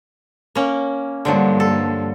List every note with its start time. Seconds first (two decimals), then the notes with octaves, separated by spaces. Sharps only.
0.55 A#3 C#4
1.25 G2 D3 F3 F#3 A#3
1.60 A4